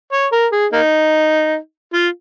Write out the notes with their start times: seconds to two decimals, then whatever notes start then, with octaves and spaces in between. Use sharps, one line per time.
0.12 C#5
0.32 A#4
0.52 G#4
0.72 A#3 D#4
1.93 F4